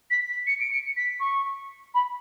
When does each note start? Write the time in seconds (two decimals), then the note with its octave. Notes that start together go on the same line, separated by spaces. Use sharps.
0.11 B6
0.29 B6
0.47 C#7
0.60 D7
0.71 C#7
0.97 B6
1.20 C#6
1.94 B5